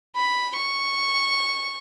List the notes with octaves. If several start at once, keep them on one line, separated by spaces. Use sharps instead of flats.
B5
C#6